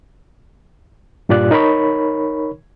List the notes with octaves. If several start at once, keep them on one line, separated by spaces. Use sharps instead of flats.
G2 A#2 F4 G4 D5 F#6
D#4 A#4 C#5 B5 C#6